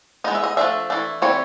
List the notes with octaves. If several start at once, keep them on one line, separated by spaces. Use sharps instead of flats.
G#3 B3 D#4 D#5
E5
D#5
F3 A3 D4 E5
E3 A3 D4
E3 G3 C4 C#5